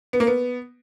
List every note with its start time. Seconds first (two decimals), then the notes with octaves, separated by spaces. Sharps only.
0.13 B3
0.20 A#3
0.27 B3